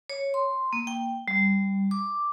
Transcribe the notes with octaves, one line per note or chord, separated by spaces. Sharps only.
C#5
C6
A#3
G5
G3
D6